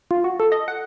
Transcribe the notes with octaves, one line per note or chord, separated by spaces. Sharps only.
F4
F#4
A4
D#5
F#5